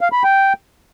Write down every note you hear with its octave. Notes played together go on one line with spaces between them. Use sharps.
F5
B5
G5